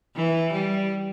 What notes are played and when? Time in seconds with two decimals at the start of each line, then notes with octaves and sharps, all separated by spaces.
0.16 E3
0.53 G3